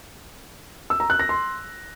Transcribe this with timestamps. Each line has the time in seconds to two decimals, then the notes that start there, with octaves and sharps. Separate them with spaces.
0.90 E6
1.00 A#5
1.10 F#6
1.19 A#6
1.29 C6